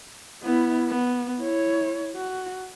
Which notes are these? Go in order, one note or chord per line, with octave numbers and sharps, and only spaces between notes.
B3 E4
B3
E4 C#5
F#4